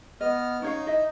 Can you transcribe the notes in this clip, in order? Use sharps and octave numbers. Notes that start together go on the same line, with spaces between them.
B3 D#5 F6
C#4 D#4 C#5 F5
E4 D#5 E5